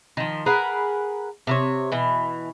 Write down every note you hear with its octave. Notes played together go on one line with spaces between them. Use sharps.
D#3 F3
G#4 A#4 B4 F#5
C3 A#4 C#5
B2 E3